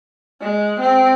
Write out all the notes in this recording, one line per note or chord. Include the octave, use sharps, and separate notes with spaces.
G#3
C4